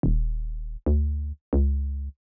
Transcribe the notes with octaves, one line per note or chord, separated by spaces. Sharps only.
D#1
D2
C#2